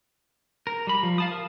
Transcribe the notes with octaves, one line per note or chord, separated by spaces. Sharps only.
A#4
G3 B5
F3
F5 A5 D#6
A#4